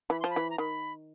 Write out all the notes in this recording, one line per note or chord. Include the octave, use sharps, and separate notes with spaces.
E3 B5
F3 C6
B5
E3
A#5
D#3 B5